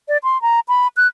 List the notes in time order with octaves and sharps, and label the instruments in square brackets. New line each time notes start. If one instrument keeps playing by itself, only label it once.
[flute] D5
C6
A#5
B5
F#6